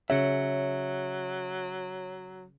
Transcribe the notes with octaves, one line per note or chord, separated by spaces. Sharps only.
C#3 F#3 C#4 G#4 C#5 E5 C#7